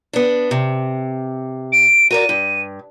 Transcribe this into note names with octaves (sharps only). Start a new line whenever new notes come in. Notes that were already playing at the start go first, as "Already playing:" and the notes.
B3 D4
C3
D7
F#4 A#4 D5 D#7
G2